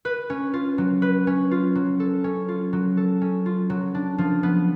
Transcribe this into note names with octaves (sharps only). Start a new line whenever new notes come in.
B4
C#4
F4
F#3
B4
C#4
F4
F#3
A4
C#4
F4
F#3
A4
C#4
F4
F#3
D4
F3
B3